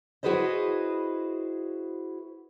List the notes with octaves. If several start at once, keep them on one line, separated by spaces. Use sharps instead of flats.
E4 F#4 G#4 B4 C5 D#5